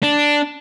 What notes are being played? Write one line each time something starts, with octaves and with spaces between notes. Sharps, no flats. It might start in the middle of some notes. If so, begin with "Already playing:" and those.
D4